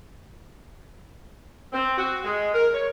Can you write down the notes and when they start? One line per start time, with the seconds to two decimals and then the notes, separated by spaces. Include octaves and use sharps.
1.73 C4
1.98 F#4
2.25 G#3
2.53 A#4
2.73 C#5